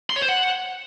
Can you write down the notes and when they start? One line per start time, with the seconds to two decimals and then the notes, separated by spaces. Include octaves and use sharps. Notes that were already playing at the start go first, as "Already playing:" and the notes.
0.10 C6
0.16 C#5
0.22 C5
0.29 F#5